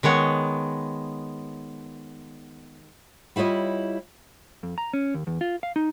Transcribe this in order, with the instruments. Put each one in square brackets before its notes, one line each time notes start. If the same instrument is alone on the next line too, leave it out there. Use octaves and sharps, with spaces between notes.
[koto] D#3 G#3 B3 C#5
[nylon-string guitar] G3 E4 F4 C#5 D#5
[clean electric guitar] F2
A#5
C#4
D#2
E2
F4
F5
D#4